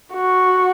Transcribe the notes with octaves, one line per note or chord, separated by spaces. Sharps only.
F#4